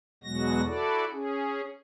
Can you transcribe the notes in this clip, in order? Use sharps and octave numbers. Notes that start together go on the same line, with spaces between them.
E2 B2 F#3 G#3 F#4 A#6
E4 F#4 A4 D5
C#4 G#4